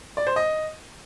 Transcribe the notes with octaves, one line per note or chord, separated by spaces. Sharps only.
D5
C5
D#5